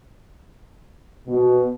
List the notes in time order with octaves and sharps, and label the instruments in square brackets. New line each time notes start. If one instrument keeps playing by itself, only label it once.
[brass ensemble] B2